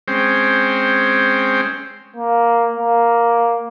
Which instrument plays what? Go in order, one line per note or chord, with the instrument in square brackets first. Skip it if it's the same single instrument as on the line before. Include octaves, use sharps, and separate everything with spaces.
[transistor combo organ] G#3 C4 C#4 C5 G5
[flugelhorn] A#3
A#3